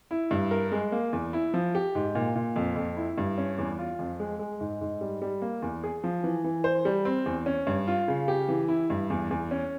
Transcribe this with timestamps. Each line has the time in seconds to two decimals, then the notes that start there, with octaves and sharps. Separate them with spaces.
0.11 E4
0.31 G2
0.51 A#4
0.72 G#3
0.92 A#3
1.13 E2
1.33 E4
1.54 F3
1.75 G4
1.95 G#2
2.15 A#2
2.35 A#2
2.56 F2
2.76 F2
2.97 E4
3.18 G2
3.38 C#4
3.58 E2
3.79 F4
3.99 F2
4.20 G#3
4.39 G#3
4.60 G#2
4.81 G#2
5.01 G3
5.22 G3
5.42 A#3
5.62 E2
5.84 G#4
6.04 F3
6.24 E3
6.44 E3
6.64 C5
6.85 G3
7.05 C4
7.26 E2
7.46 C#4
7.67 G2
7.88 F4
8.08 C#3
8.28 G4
8.48 E3
8.68 E4
8.90 G2
9.10 E2
9.31 E2
9.51 C#4